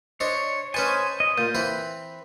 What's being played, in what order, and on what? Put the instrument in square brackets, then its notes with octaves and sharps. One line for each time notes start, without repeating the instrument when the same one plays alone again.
[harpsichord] D4 C5 D#5 [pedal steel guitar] C#5
[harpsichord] C#4 B4 A5 [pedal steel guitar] C5 D#5 G#5
[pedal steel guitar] D#5
[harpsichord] A#2 [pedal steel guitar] G6
[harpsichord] E3 C4 B4